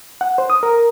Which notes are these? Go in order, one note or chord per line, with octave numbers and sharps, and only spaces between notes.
F#5
C5
D#6
A#4